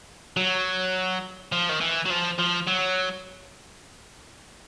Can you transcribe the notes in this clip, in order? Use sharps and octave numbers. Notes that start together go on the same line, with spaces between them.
F#3
F3
D#3
E3
F#3
F3
F3
F#3